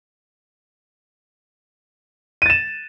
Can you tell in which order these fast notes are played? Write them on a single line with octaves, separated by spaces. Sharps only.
D#7 A6 E7